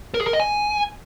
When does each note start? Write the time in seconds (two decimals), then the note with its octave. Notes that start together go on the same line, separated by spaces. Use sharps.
0.14 A#4
0.21 G#4
0.27 A#4
0.33 D#5
0.40 G#5